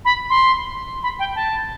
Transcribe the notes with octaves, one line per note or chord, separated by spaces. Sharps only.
B5
C6
B5
G5
A5